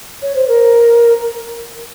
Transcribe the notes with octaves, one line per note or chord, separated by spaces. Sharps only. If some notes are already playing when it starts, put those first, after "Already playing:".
C#5
C5
A#4